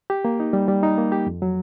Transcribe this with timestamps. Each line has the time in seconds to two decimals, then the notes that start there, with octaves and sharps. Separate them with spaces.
0.10 G4
0.25 A#3
0.40 D#4
0.53 G3
0.68 G3
0.83 D#4
0.98 A#3
1.12 G4
1.27 F2
1.42 F#3